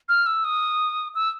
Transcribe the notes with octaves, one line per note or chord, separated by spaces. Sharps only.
F6
E6
D#6
E6